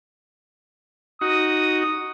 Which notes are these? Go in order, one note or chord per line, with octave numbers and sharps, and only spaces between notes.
D#4 F#4 D#6